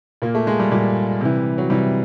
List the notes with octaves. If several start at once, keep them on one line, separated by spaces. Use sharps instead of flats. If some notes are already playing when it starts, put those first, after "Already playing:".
A#2 A#3
A3
G#3
G3
A#2 G3
C3 E3
F#3
C3 E3 G3